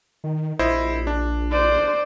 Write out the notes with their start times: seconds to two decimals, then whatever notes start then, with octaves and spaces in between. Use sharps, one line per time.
0.24 D#3
0.59 A#1 E4 C5 D#5
1.07 D4
1.52 C5 D5